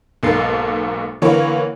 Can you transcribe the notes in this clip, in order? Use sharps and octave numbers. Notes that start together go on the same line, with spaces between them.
B1 G#2 A#3 A4 A6 C7
D3 E3 A#3 B3 A#4 C#5